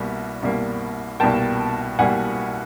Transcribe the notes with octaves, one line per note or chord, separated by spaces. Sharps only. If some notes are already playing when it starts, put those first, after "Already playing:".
Already playing: C2 B2 G3 A#3
C2 B2 G3 A#3
C2 B2 G3 A#3 G5 A5
C2 B2 G3 A#3 F#5 G#5